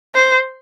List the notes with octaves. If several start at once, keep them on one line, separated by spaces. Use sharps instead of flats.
C5